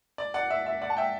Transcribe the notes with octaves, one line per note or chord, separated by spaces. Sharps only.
D5
D5 F#5
E5
E5
D5 F#5
A5
E5 G5